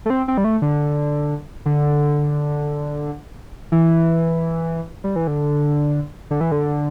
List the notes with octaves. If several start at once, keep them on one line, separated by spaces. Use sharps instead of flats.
A3
C4
C4
G3
A3
D3
D3
E3
G3
E3
D3
D3
E3
D3